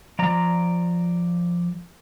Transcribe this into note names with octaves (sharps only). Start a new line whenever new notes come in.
F3 D5 A#5